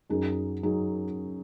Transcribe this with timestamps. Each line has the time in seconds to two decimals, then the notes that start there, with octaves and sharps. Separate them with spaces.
0.10 F#2 F#3 D#4 G#4
0.63 F#3 D#4 G#4